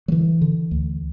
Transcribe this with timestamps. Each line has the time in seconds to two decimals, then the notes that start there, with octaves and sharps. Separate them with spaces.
0.08 F#3
0.12 D3 E3
0.41 D3
0.71 D2